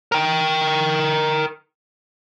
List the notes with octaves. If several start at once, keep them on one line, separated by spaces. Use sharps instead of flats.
A#4 G5